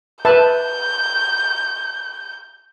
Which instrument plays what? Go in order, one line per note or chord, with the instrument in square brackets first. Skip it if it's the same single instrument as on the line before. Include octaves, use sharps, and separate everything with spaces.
[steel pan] B4 E5 A5 [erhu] G6